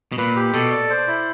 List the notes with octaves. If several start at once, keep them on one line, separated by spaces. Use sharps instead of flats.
B2
A#2 B4
G4
B2 A4
D5
C5
E4